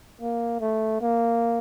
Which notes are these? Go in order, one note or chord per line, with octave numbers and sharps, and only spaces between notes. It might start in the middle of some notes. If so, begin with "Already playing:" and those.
A#3
A3
A#3